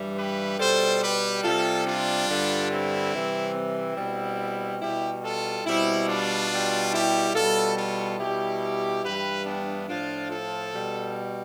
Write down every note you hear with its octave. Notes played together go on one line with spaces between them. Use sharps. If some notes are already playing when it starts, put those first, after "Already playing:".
Already playing: G2 E3 G3
G4 B4
B2 G3 A4 C5
G4 B4
C3 G3 F4 A4
D4 F4
G2 D3 G3
C4 E4
C3 E3 G3
C4 E4
B2 G3
B2 G3 E4 G4
F4 A4
B2 G3 C4 E4
D4 F4
B2 G3
E4 G4
B2 G3 F4 A4
F4 A4
B2 G3 E4 G4
G2 E3 G3 G4 B4
B3 D4
A2 F3 D4 F4
F4 A4
B2 G3